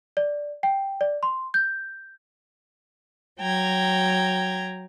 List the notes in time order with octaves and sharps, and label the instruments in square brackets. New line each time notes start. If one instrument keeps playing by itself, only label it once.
[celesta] D5
G5
D5
C6
G6
[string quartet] F#3 G5 A#5 G#6